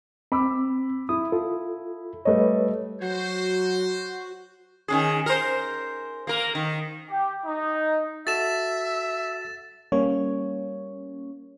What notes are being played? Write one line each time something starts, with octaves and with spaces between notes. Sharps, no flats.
C4 B5 D6 E6
E4 D#6
F4 A4
G3 A3 B4 C#5 D#5
F#3 F#4 C5
D#3 C#4 G#4
A#4 C5
A#3 A#4
D#3
G4
D#4
F#4 A4 E5 A6 E7
G3 A#3 C#4 C#5